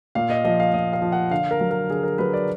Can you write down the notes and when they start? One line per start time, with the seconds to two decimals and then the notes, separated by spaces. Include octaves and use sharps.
0.15 A#2 F5
0.30 D#5
0.45 F3 D#5
0.60 F5
0.74 A#2 D#5
0.93 F5
1.02 F3
1.12 F#5
1.31 D3 F5
1.51 A#4
1.61 F#3
1.71 A#4
1.89 D3 G#4
2.03 A#4
2.18 F#3 B4
2.33 D5